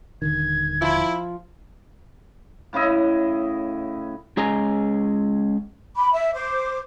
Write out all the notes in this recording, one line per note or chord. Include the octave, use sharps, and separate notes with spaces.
D#1 D3 D#3 G#6
F3 E4
A2 C#3 E4 D#5
G#3 C#4 G#4 D#5 G#5 A#5
B5 D6
E5
C5 D6